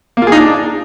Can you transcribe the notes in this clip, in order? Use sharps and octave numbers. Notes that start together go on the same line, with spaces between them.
A#3
F4
G#4
D#4
D4